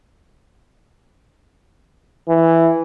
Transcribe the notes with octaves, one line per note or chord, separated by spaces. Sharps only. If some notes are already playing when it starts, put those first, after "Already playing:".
E3